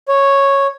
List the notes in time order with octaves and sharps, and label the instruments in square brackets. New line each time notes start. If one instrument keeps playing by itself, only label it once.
[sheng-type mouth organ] C#5